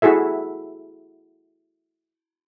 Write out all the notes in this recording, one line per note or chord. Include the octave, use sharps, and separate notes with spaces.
E4 F#4 G#4 A4 E5